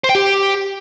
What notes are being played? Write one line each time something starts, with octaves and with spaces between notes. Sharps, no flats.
C5
G5
G4